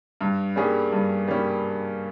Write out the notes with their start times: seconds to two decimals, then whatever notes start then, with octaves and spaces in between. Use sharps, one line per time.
0.21 G2
0.56 G3 A#3 C#4 G#4
0.92 G2
1.28 G3 A#3 C#4